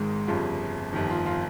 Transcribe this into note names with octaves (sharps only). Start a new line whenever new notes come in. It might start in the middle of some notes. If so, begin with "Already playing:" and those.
Already playing: G#1 G#2 D#3 G#3
G1 F2 C#3 G3 F4
G1 F2 D#3 G4
F4
F4